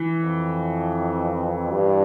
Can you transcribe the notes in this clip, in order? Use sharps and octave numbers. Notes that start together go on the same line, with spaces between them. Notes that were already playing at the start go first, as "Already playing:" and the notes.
Already playing: E3
F2
G2